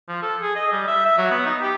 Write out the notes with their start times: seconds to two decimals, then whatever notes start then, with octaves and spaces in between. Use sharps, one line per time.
0.09 F3
0.22 A4
0.42 G#4
0.56 D#5
0.72 G3
0.88 E5
1.05 E5
1.18 F#3
1.31 B3
1.46 D#4
1.61 G4